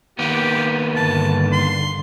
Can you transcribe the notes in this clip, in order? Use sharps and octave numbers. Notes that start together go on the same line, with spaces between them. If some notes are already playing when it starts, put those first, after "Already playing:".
D#3 A#3 B3 G4
G2 D3 A5
C6